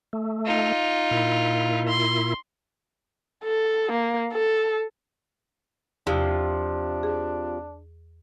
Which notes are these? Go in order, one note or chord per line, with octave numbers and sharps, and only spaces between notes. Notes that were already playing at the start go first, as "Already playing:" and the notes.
A3
D#4 F4
A#2 E4
C6
A4
A#3
A4
E2 C3 F3 D4 F5 D#6
G#4